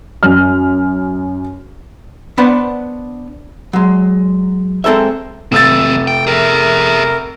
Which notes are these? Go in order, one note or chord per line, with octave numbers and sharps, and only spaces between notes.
F#2 F6
B3 D4 B4 C5 F#5
F#3 G#3
G#3 C4 A4 A#4 E5
F1 D#2 C4 E6 A6
G5
G#4 A#4 E5